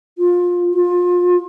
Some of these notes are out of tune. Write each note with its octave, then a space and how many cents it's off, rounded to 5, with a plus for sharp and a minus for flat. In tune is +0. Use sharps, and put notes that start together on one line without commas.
F4 +20
F4 +25